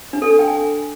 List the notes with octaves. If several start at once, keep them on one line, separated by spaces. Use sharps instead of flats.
D4
A4
D4
G5
G#5